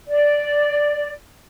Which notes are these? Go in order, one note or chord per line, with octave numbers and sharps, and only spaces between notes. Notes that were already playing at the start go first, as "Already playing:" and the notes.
D5